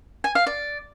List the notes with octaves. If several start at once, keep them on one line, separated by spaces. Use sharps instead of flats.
G#5
F5
D5